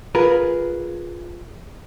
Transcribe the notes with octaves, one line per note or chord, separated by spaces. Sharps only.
F4 G#4 A#4 B4